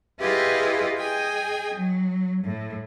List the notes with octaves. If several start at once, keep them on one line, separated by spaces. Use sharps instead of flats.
E4 F4 G4 G#4 B4 D#5
G#4 D#5 G5 G#5
F#3
A2